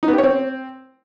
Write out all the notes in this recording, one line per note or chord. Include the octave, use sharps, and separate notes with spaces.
D#4
B3
G4
C#5
C4